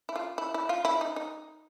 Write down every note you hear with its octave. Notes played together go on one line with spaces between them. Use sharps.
E4
F4
E4
E4
F4
E4
D#4
D#4